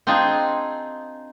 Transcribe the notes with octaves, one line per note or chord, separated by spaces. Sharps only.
C4 D4 D#4 F4 G#4